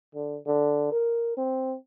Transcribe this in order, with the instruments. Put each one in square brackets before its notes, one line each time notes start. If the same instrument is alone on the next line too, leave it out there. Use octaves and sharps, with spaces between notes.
[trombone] D3
D3
A#4
C4